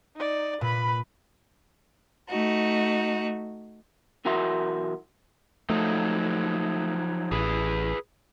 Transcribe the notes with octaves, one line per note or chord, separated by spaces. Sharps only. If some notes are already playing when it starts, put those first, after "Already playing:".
D#4 D5
A#2 B4 B5
A3 D#4 F#4
B1 E3 F#4 A#4 E5 C6
F3 F#3 A3 D#4
A1 G#4 B4